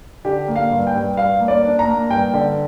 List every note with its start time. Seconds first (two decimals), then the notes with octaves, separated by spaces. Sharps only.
0.25 D3 G4
0.48 A#3
0.56 F5
0.71 G2
0.87 G5
0.95 G2
1.17 G2 F5
1.40 A#3
1.48 D5
1.64 D4
1.79 A#5
1.87 A#3
2.10 G2 G5
2.34 D3